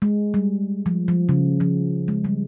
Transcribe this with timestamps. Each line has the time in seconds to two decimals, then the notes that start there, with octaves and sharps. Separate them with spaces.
0.02 G#3
0.34 G3
0.86 F3
1.08 F3
1.29 C#3
1.60 F3
2.08 G#3
2.24 G3